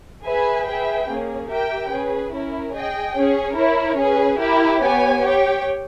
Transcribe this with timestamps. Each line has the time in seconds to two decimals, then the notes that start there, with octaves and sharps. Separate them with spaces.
0.24 G#4 B4 E5 G#5
0.66 G#4 B4 E5 G5
1.08 A#3 C#4 G#4
1.48 G4 A#4 E5 G5
1.89 C#4 G#4 B4
2.31 C#4 E4 A#4
2.73 G#4 D#5 G5
3.15 C#4 G#4 C#5
3.56 E4 A#4 C#5
3.97 C#4 G#4 B4
4.39 E4 G4 A#4
4.80 B3 G4 C#5 G#5
5.21 G4 C#5 G5